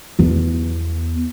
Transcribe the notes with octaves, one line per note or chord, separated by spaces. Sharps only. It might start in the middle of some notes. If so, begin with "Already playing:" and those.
E2 B3